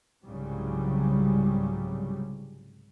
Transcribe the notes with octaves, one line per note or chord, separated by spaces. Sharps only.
C2 G#2 C#3 F#3 G3